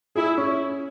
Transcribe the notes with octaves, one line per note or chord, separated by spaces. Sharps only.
E4 G#4
C#4